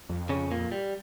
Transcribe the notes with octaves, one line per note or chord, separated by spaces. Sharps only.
F2
C#3 C#4
A#2 A#3
G3